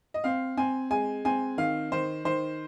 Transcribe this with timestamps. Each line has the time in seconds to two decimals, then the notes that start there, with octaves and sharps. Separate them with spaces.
0.14 D#5
0.24 C4 F5
0.57 C4 G#5
0.91 G#3 G#5
1.25 C4 G#5
1.58 D#3 F5
1.92 D#3 C5
2.25 D#3 C5